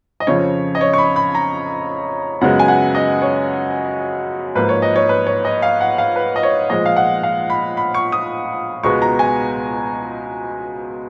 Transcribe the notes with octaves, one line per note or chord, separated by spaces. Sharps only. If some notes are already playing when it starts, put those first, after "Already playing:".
D#5
F2 C#3 F3 C#5
D#5
C#5
C#6
B5
B5
A#5
F#2 C#3 G#3 B3 F#5
G#5
F#5
D#5
C#5
G#2 F3 A#3 B4
C#5
D#5
C#5
B4
C#5
D#5
F5
F#5
F5
B4
D#5
C#5
A#2 F3 G#3 D#5
F5
F#5
F5
B5
B5
C#6
D#6
C#2 B2 G#3 B3 C#6
A#5
G#5